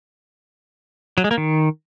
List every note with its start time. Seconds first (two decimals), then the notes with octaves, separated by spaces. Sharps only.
1.18 F#3
1.24 G#3
1.31 A#3
1.38 D#3